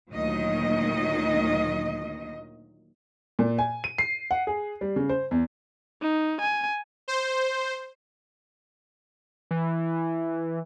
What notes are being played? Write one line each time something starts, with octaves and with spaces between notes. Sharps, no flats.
D2 A#2 D#3 F#3 D#5
A#2
G#5
D#7
C7
F#5
G#4
G3
C#3
C5
E2
D#4
G#5
C5
E3